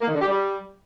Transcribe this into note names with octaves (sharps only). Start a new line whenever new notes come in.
A#3
D#3
D3
G4
G3